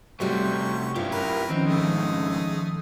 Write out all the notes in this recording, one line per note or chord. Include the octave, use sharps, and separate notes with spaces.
C3 G3 A3 C#4 F#4 C5 C#6
G2 C#4 E4 F4 G4 F5
F#2 A#4 B4
D#3 F3 C4 C#4 D#4
F2 G#2 G#3 A3 D#6